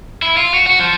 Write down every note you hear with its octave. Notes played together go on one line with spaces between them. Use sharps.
E4
F4
F#4
F#4
F3